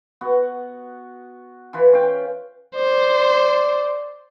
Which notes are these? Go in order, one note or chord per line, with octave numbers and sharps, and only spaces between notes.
B3 F#4
E3 F4 B4
C#4 F5 G5
C5 D5